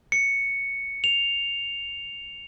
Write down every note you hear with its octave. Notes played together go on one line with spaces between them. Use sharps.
C#7
F7